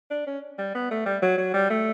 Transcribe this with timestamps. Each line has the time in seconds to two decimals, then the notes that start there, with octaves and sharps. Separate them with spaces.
0.11 D4
0.27 C#4
0.58 G3
0.75 B3
0.91 A3
1.06 G3
1.22 F#3
1.38 F#3
1.54 G3
1.70 A3